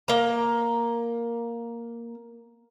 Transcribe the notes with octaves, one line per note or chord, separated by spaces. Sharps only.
A#3 A#5